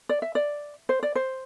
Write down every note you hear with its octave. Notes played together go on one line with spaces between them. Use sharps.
D5
E5
D5
C5
D5
C5